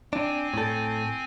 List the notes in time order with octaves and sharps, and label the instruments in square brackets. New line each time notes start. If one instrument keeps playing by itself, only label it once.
[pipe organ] C4 G#5 [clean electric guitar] D4
[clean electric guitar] A2 A4